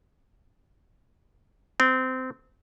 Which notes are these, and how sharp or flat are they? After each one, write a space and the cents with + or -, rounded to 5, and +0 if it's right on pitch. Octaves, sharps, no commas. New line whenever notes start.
C4 -20